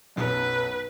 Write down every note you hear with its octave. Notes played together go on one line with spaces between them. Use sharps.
B1 F#2 B4